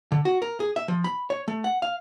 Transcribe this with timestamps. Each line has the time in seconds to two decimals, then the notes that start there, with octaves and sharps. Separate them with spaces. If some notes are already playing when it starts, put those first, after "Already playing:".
0.12 D3
0.25 F#4
0.42 A#4
0.60 G#4
0.76 E5
0.88 F3
1.04 B5
1.30 C#5
1.48 A3
1.64 F#5
1.82 F5